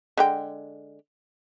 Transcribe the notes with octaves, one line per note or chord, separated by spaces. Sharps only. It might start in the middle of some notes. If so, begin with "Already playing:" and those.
D3 G#3 G5